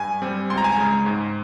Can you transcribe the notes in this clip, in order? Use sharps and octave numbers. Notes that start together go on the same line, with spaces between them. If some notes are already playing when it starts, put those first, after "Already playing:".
Already playing: G2 G#5
G3 C4
C#2 C6
A#5
G#5
A#5
C#3 G#3
G#2